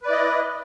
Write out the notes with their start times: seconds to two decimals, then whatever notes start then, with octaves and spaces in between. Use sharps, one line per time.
0.03 B4
0.06 D5
0.09 E4
0.12 D#5